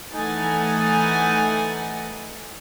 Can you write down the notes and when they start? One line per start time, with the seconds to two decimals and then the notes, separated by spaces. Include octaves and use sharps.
0.14 E3 A3 D#4 F#5 G#5 A6